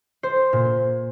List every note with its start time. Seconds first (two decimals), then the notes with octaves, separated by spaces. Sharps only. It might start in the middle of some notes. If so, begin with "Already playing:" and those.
0.23 C5
0.53 A#2